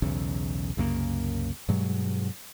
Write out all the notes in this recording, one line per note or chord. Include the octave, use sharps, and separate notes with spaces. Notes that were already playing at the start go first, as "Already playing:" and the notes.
B1 E2 C#3
C2 F#2 C#3 A#3
G2 B2 F#3 G#3